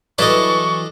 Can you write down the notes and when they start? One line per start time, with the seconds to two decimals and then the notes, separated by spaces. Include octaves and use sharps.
0.19 E3 F#3 D4 A4 B4 D#5 C#6